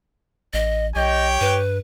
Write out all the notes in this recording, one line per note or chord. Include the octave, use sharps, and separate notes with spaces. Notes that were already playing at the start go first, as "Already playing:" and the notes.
A1 D#5
B1 G4 C#5 D#5 G5
G2 B4